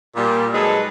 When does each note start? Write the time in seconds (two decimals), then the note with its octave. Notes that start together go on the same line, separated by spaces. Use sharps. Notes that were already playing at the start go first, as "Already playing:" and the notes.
0.16 A#2 G3
0.54 F#3 G#3 D#4 G#4 A4 B4